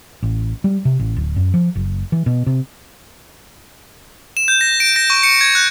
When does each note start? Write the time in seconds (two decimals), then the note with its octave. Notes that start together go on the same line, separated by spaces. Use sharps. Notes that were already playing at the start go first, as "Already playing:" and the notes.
0.23 A1
0.64 G3
0.85 C3
0.99 A1
1.16 D1
1.36 F#2
1.54 F3
1.75 F#1
2.12 E3
2.26 B2
2.47 C3
4.37 E7
4.48 G6
4.61 A#6
4.80 D7
4.96 A#6
5.10 C#6
5.23 C#7
5.41 G#6
5.55 F#6